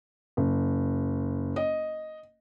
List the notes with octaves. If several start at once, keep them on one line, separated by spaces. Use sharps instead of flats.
F#1
D#5